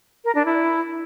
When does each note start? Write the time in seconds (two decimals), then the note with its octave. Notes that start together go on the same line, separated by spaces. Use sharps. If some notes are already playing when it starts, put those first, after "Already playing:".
0.25 A#4
0.35 D4
0.45 E4